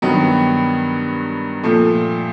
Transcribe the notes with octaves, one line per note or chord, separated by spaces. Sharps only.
G2 D#3 F#3 B3
A#2 F3 A3